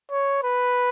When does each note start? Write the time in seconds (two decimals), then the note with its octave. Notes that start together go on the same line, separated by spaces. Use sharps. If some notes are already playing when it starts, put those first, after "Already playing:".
0.11 C#5
0.43 B4